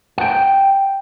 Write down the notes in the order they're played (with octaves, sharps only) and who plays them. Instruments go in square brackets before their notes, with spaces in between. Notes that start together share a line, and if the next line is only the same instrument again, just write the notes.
[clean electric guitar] F#5 G5